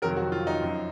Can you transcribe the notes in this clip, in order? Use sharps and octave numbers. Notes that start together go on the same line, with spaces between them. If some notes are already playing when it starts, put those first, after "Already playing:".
F2 C3 D#3 F#3 A#4
F#4
F4
D#4
F#2 F3